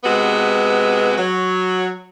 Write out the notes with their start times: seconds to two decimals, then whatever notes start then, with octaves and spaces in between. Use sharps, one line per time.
0.04 C3 G#3 B3 F#4 B4
1.17 F#3